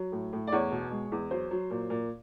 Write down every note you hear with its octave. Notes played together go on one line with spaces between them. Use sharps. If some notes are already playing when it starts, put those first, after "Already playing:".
Already playing: F#3
A2
A2
D5
E2 C#5
B2
G#3
E2
F#3 C5
F#3
A#2
A#2